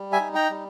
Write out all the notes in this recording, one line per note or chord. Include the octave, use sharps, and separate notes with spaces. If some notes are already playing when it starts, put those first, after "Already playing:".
Already playing: G3
E5 G#5
D#4
G5 A#5
G3